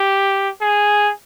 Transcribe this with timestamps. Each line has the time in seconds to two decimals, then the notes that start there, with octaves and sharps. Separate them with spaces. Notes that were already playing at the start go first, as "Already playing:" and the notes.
Already playing: G4
0.61 G#4